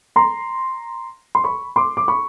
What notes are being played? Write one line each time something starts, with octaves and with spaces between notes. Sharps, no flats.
A#5 C6
C6
B5 C#6
C6 D6
D6
B5 C#6